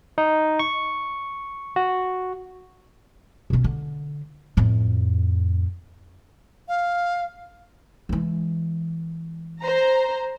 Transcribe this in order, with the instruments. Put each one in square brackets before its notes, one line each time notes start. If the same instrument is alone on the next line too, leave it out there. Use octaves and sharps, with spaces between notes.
[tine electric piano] D#4
C#6
F#4
[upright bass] B2 C#4
D3
F2 A2
[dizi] F5
[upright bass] E3 G#3
[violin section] C5 A#5